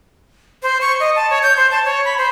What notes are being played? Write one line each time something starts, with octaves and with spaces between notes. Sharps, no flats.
C5
C#6
D#5
A5
C#5
G6
C5
A5
C#5
B5
C5